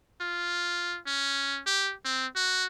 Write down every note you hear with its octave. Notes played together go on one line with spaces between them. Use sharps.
F4
C#4
G4
C4
F#4